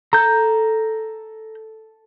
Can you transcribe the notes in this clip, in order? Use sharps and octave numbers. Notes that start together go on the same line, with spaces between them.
A4 A#5 G6